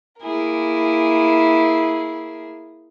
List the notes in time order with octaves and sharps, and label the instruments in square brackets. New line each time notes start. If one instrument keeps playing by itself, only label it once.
[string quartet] A#3 E4 G#4 A#4